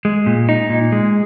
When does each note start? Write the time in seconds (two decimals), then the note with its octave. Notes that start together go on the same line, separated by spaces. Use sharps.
0.05 G#3
0.26 A#2
0.49 D#4
0.70 A#2
0.92 G#3